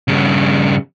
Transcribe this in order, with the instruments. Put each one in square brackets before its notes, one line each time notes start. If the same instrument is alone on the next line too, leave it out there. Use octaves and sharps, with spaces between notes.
[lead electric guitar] G2 C#3